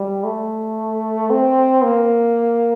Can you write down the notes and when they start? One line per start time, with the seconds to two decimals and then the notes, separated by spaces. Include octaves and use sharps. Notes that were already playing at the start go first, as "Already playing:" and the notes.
Already playing: G3
0.24 A3
1.30 C4
1.83 A#3